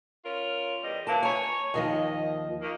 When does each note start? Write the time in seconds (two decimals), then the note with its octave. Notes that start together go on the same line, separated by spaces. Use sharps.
0.24 C#4 F4 A#4
0.82 E2 G3 D#5
1.07 E3 F#3 A#3 A5
1.23 C#5 G#5 A#5
1.74 D#2 D#3 F3 D#5
2.61 D#3 A#3